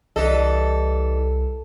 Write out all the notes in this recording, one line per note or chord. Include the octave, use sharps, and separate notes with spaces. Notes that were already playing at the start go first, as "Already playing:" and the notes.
C2 E3 G3 A4 D#5